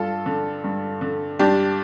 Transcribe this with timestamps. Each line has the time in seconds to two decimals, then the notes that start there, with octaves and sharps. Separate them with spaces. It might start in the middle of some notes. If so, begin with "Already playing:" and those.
Already playing: G2 F4 A4
0.26 D3
0.64 G2
1.01 D3
1.39 G2 D4 G4